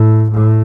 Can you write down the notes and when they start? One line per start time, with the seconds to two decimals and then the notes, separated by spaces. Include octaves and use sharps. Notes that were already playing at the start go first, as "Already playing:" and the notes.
Already playing: A2
0.31 A2